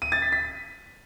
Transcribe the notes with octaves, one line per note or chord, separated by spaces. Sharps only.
D#7
A6
B6
B6